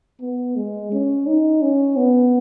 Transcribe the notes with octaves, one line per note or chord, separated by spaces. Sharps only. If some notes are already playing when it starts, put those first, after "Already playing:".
B3
G#3
C#4
D#4
C#4
B3